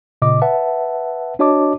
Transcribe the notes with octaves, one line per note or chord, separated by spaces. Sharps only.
A#2 C#3 D#5 D6
B4 E5 F#5 A5
D4 F#4 C#5 D#5 A5 D6